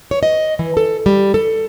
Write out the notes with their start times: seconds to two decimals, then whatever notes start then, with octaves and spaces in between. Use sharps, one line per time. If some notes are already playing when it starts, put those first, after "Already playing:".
0.11 C#5
0.23 D#5
0.59 E3
0.77 A4
1.06 G3
1.34 A4